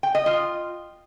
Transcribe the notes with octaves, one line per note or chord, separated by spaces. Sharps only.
G5
D#5
F4